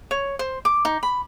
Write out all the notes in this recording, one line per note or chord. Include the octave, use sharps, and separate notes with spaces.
C#5
C5
D6
D#4
B5